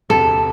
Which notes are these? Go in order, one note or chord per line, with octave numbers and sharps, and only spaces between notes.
E1 D2 C3 A4